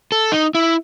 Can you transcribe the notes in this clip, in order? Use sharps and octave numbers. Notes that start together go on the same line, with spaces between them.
A4
D#4
E4